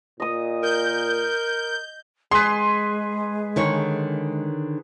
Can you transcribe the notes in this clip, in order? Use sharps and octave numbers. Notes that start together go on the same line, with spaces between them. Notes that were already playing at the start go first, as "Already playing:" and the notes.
A#2 D#5 D#6
A#4 G6
G#3 G#4 B4 C6
D3 D#3 C#5